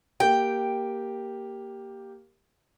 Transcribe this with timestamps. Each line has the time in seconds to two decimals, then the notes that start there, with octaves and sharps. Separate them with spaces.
0.20 A#3 G4 G5